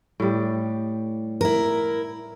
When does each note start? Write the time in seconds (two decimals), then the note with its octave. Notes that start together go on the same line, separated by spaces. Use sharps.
0.20 A2 G3
1.41 E4 A#4